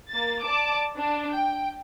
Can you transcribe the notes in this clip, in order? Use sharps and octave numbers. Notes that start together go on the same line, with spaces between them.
A#3 A6
D5 A5 D6
D4
G5